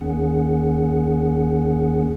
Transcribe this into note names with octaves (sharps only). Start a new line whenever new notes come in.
D#2 D#3 A#3 C#4 G#4 F#5